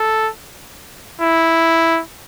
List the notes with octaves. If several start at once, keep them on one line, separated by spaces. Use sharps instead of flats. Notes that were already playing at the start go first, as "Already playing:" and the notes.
Already playing: A4
E4